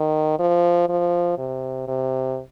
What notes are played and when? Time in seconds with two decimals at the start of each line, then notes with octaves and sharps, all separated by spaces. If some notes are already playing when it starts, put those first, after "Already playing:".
Already playing: D#3
0.39 F3
0.89 F3
1.38 C3
1.88 C3